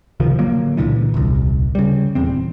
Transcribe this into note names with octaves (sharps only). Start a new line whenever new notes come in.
C#2 C3 D#3 F3
A2 D3 F#3 A#3
C#2 A#2 D3 E3
D#1 C2
C#3 G3
D#1 E2 C4